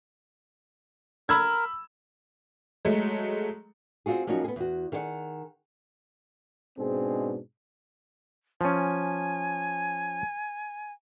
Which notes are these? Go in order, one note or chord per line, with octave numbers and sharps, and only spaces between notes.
A#4 B5 E6 G#6
F#3 G#3 A3
C4 D#4 F4 F#4 G#4
F3 F#3 A#3 C#4 D#4 F#4
B3 G#4
E2 F#4
D#3 G#4 D5 F#5
G#2 B2 C4 D4 G#4
F3 C#4 G#5